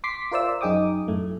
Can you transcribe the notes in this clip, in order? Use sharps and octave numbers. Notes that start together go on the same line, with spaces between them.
C6 D6 B6 C7
F4 A#4 C5 D5 E5 E6
D5
F#2 D#4 G#4 G5 D6 D#6
F#2 A2 A3